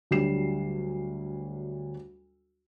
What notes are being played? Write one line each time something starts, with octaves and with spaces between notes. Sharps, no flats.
D2 F#3 G3 D4 C7 E7